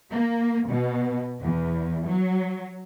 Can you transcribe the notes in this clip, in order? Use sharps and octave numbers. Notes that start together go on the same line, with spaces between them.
A#3
B2
E2
F#3